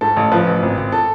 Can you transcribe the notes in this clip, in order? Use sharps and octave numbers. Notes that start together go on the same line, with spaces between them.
G#2 A4
A1
F3 B4
A1
G#1
G#1
A4